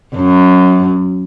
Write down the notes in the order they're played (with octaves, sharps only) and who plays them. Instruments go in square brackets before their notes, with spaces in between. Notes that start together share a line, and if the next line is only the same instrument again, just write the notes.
[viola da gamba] F#2